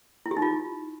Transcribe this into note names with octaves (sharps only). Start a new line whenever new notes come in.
E4
G4
D#4
F4